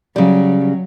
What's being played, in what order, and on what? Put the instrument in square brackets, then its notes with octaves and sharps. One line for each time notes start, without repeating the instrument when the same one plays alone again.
[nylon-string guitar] C#3 G3 [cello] F#3